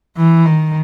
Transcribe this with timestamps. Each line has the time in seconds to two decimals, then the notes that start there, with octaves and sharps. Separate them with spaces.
0.17 E3
0.45 D#3